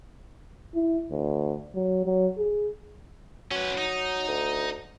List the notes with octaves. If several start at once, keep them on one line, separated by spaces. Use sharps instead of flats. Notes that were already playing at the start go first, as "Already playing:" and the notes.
E4
D2
F#3
F#3
G#4
F#3 C#4 B4
D#4
D2